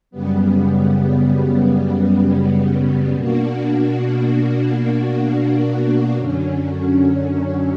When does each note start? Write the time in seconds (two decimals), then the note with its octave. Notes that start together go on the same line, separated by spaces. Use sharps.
0.11 F#2 C#3 G3 B3
3.13 B2 A#3 D4 F#4
6.16 F#2 D3 F#3 C#4